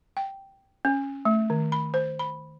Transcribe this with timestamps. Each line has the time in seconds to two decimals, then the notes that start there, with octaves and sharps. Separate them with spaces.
0.17 G5
0.85 C#4
1.25 A3
1.50 D#3
1.72 B5
1.94 C5
2.19 B5